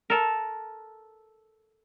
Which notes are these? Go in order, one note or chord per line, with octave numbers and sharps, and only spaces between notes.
A4 A#4